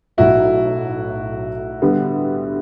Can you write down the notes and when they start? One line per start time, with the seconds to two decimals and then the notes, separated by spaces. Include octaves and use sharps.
0.17 B1 A2 F#3 B3 E4 F#4
1.82 D3 G3 B3